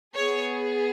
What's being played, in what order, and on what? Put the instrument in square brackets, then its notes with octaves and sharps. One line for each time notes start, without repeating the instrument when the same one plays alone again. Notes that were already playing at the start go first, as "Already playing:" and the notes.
[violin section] B3 G#4 C#5